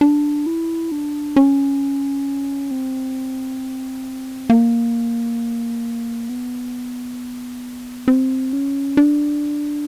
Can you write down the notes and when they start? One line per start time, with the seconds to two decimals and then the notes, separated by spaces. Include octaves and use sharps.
0.01 D4
0.46 E4
0.92 D4
1.36 C#4
2.71 C4
4.50 A#3
6.29 B3
8.08 C4
8.53 C#4
8.97 D4